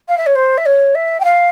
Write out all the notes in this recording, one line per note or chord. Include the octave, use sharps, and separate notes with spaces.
F5
E5
C#5
C5
E5
C#5
E5
G5
F5